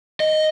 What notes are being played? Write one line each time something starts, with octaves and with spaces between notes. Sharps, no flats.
D#5